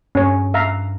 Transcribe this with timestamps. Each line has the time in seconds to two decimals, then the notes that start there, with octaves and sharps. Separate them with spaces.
0.15 G2 C#4 C#5
0.54 E5 F5 A#5